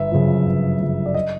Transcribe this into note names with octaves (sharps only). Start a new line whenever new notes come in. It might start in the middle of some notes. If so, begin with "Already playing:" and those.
Already playing: G1 E5
F#2 C#3 F3
G1
F#2 C#3 F3
D5
D#5